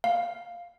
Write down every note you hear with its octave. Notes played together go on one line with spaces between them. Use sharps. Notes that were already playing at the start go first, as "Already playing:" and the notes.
F5